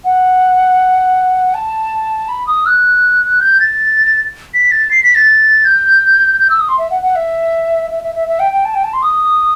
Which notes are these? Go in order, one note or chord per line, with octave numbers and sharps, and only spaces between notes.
F#5
A5
B5
D#6
F#6
G6
A6
B6
A6
C7
B6
A6
G6
G6
E6
D#6
C6
E5
F#5
F#5
E5
E5
E5
E5
E5
G5
G5
A5
G5
A5
C6
D#6